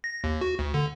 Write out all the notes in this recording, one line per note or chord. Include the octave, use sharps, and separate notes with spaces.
A#6
D#2
F#4
D2
D3